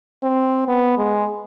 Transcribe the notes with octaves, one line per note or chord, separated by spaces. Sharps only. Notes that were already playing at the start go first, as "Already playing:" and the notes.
C4
B3
G#3